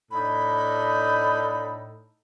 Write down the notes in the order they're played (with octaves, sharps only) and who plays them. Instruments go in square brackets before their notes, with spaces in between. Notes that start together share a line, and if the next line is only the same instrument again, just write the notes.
[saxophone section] A2 D4 D#4 [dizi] B5